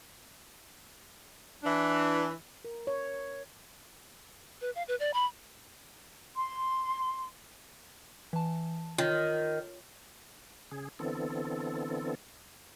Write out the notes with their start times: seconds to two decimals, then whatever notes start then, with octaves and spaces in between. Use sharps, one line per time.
1.63 E3 D4
2.65 A#4
2.87 C#5
4.61 B4
4.75 F5
4.88 B4
5.00 D5
5.14 B5
6.36 C6
8.33 E3 A5
8.98 D#3 F4 C#5
10.71 C#3 G#4
10.99 D3 E3 B3 C4 A4